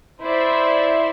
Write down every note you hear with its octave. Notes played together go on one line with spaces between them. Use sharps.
E4 C5 D5 E5